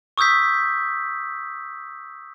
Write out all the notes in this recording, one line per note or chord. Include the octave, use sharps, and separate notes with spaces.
C#6 D#6 E6 G6 B6